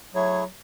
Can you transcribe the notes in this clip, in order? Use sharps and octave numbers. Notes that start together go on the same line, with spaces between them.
F#3 A3 E4 G#4 C#5